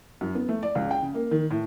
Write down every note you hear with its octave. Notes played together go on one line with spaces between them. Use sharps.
F#2
B3
A3
D5
C#2
G5
C#3
A#3
D#3
A2